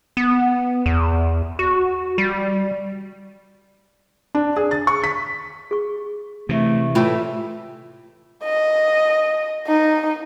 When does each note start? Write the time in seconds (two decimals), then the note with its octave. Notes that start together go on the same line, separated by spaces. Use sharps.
0.17 B3
0.86 E2
1.59 F#4
2.18 G3
4.35 D4
4.56 G#4
4.71 A6
4.87 C#6
5.04 B6
5.71 G#4 C#6
6.49 C3 E3 A3
6.95 A2 E3 F4 G4 C#5 E5 A5
8.44 D#5
9.67 D#4